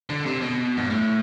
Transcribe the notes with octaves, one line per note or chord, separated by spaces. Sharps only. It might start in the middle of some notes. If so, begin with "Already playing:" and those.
D3
C3
B2
G2
A2